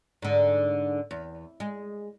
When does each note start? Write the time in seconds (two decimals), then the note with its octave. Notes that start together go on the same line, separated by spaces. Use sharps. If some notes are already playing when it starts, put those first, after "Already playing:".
0.22 G#2 D3
1.11 E2
1.60 G#3